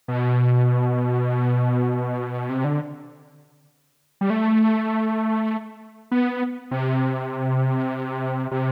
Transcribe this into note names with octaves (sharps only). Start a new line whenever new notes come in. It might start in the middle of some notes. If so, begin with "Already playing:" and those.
B2
C3
D3
G3
A3
B3
C3
C3